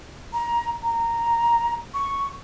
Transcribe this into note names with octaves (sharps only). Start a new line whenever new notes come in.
A#5
A#5
C#6